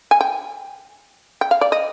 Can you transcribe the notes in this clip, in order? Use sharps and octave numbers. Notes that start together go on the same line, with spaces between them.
G#5
G5
G5
F5
D5
D#5